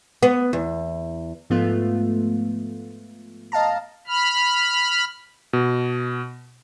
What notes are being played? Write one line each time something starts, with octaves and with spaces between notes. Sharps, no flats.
B3
E2
G#2 F3 A3 B3 F4
D#5 F5 A5 A#5
B5 F6
B2